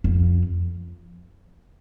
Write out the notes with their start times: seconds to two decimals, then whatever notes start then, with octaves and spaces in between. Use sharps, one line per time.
0.04 F2